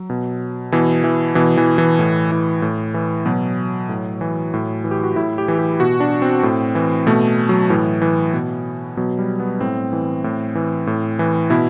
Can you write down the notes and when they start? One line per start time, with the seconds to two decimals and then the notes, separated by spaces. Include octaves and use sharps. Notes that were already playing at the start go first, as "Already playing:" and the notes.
Already playing: F#3
0.10 B2
0.72 B2 E3
1.04 E3
1.35 B2 E3
1.57 E3
1.78 E3
1.99 A2
2.32 E3
2.62 A2
2.94 E3
3.26 B2 F#3
3.89 A2
4.21 E3
4.54 A2
4.84 E3
4.91 G4
5.04 F#4
5.16 A2 E4
5.38 G4
5.48 E3
5.59 G4
5.79 B2 F#4
6.00 D4
6.22 C4
6.43 A2
6.75 E3
7.07 B2 A3
7.49 F#3
7.70 A2 E3
8.02 E3
8.34 B2
8.97 B2 F#3
9.19 G3
9.40 B3
9.61 A2 C4
9.93 E3
10.24 A2
10.55 E3
10.87 A2
11.19 E3
11.50 B2 E4